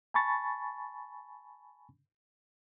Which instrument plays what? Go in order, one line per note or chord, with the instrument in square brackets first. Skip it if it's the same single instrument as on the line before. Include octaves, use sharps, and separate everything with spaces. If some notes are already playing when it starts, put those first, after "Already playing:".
[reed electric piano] G#5 A5 B5 C#6 A6